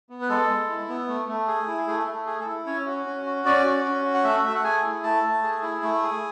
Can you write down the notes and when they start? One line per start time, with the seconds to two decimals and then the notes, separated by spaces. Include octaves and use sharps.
0.10 B3
0.22 B4
0.29 G#3 A4
0.49 G#3
0.69 E4
0.89 B3
1.08 A3
1.28 A3
1.48 G#4
1.68 E4
1.87 A3 G#4
2.07 A3
2.26 G#4
2.41 A4
2.46 E4
2.66 C#4 C#5
2.86 F#4
3.06 C#4
3.26 F#4
3.45 C#4 D5
3.66 F#4
3.85 C#4
4.05 F#4
4.14 F#5
4.24 A3 E5
4.44 A3 E5
4.55 F#5
4.64 G#4 G#5
4.83 E4
5.03 A3 A5
5.24 A3
5.43 G#4
5.63 E4
5.83 A3
6.03 G#4